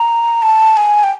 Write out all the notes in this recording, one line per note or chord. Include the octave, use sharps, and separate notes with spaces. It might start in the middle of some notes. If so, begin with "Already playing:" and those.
Already playing: A#5
A5
G#5
G5